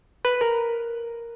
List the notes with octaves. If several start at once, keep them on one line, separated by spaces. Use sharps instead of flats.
B4
A#4